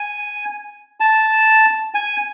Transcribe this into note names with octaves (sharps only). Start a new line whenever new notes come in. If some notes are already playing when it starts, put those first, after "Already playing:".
Already playing: G#5
A5
G#5